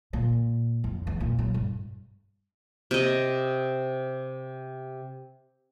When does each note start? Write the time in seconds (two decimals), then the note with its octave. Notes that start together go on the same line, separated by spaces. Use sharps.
0.13 A#2
0.84 F1
1.07 E2
1.20 A#2
1.39 B1
1.54 G2
2.91 C3 D#5